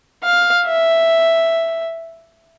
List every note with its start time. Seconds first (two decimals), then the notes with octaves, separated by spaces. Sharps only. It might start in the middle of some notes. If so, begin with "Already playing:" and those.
0.24 F5
0.66 E5